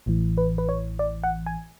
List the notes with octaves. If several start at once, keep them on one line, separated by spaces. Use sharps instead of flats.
A1 A2 E3
B4
B4
C#5
D5
F#5
G#5